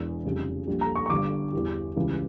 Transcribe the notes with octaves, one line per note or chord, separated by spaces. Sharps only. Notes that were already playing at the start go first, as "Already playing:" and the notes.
Already playing: E1 E2 E3
F1 F2 C#3 G3
A#1 A#2 G3
A#5
C#6
C#6
G1 G2 D3 D6
E2 E3 G3
C#2 C#3 E3 G3